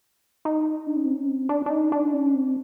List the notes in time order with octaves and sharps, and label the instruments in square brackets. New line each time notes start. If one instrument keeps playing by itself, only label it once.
[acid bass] D#4
D4
C#4
C4
C#4
C4
D4
D4
D#4
D4
C#4
C4